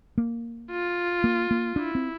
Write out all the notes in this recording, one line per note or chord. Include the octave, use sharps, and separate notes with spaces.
A#3
F4
A#3
A#3
D4 E4
C4